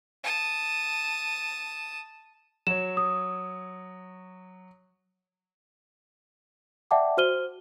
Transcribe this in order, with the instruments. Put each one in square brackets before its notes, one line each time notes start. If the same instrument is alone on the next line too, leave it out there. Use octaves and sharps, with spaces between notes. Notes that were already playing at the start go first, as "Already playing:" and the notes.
[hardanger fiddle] A5 D#6
[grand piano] F#3 C#5 [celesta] E7
[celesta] D#6
D5 E5 F#5 G5 A5 D6
F#4 C5 F6 D#7 G7